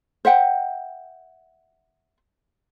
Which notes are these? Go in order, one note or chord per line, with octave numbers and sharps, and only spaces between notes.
C5 E5 F#5 G5